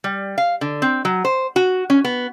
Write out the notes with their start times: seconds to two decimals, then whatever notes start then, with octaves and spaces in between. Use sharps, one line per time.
0.04 G3
0.38 F5
0.61 D3
0.82 C4
1.05 F#3
1.25 C5
1.56 F#4
1.90 C#4
2.04 B3